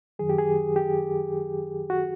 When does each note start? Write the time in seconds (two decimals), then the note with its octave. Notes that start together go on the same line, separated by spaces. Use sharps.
0.19 F#2 D#3 F#3 G#4
0.29 G4
0.38 G#4
0.76 G4
1.90 F#4